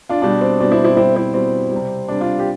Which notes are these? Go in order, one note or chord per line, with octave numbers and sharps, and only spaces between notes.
D4 F4
B2 G3 D4
C4
B2 G3 D4
C4 E4
C4 E4
B2 G3 C4 E4
C4 E4
B2 G3 C4
C3 G3
C3 G3 D4
D4 F4
G4